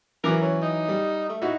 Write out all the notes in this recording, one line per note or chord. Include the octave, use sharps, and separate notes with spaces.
E3 F#3 A#4 D6
C#4
D#4
G3
A3
D#4 E4 F#4